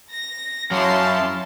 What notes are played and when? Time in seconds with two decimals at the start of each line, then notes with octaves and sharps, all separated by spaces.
0.12 A#6
0.71 F#2 F#3 E4 F5 A5 C6